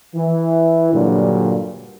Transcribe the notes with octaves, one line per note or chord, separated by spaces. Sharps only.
E3
G2 A#2 D3 F#3